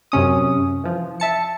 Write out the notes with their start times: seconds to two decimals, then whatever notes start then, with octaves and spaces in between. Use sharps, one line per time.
0.12 F#2 C3 C#4 D#6
0.84 E3 F3
1.20 E5 A5 C#7